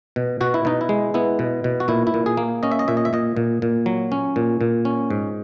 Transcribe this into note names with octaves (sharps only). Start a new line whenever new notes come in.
B2
B2 F#4
E4
B2 D#4
E4
G#3
B3 E4
B2
B2
F#4
A#2 E4
E4
A#2
G#4
A#3
C#4 D#5
E5
D#5
A#2 E5
D#5
E5
A#2 D#5
A#2
A#2
F#3
C#4
A#2
A#2
C#4
G#2